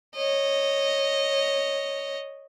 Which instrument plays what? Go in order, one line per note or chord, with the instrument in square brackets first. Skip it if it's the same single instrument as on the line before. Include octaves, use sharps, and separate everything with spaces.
[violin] C#5 D#5